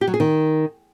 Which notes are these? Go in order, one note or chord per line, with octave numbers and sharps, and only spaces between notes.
G4
F#3
G#4
D#3